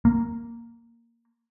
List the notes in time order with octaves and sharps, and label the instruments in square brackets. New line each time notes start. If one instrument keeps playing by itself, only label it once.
[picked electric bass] A#3